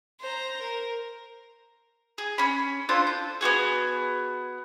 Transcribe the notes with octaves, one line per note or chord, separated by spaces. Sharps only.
C5 A#5
A#4
G#4
C#4 B5
D4 F4 A4 C5
G6
B3 C#4 F#4 G#4